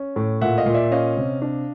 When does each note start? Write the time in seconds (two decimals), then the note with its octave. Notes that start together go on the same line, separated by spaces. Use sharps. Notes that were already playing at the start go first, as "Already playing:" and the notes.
Already playing: C#4
0.16 A2
0.41 A#2 E5 F#5
0.58 D#5 F5
0.66 A#2
0.74 D5 E5
0.91 C#4 D#5 F5
1.17 C3
1.42 D4